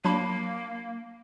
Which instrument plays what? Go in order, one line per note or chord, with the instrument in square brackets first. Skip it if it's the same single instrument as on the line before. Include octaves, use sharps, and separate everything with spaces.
[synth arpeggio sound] F#3 D4 B5 [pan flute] A#3